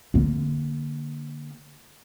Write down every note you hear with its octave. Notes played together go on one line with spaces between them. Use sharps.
D3 A#3